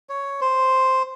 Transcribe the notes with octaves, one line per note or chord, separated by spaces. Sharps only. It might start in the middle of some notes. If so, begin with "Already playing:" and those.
C#5
C5